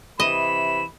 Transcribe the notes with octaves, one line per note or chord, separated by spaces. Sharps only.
C3 E3 D#5 B5 E7